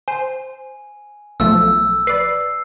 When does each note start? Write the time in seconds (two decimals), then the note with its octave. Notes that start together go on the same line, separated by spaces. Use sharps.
0.08 C5 G#5
1.40 B1 F3 A3 E6
2.07 B4 D5 C7